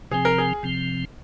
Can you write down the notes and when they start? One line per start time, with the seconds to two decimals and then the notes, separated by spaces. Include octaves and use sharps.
0.11 C3 F3 C4 G#4
0.25 A#4
0.38 G#4
0.63 C3 F3 C4